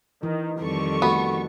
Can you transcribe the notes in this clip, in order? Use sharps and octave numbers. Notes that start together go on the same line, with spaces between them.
D#3 E3
F2 D#3 G3 A4 C#6
A3 B3 F#4